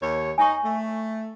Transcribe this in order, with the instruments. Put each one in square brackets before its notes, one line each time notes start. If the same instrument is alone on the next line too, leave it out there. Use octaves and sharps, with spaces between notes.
[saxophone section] D#2 C#5
[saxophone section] D#4 [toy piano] G#5 C#6
[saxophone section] A3